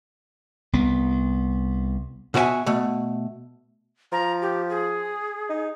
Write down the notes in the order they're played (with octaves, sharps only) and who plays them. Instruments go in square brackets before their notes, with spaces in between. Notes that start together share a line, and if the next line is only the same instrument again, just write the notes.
[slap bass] C2 B3
[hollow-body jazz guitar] B2 F#4 D5 E5 G#5
B2 A3
[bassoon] F3 [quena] A#5
[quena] G4
G#4
[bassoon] D#4